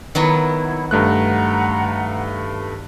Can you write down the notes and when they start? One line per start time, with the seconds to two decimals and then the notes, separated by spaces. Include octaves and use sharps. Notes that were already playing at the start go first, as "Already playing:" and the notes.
0.15 D#3 F#3 B3 E4
0.91 G2 A3 F#5 A#5 F#6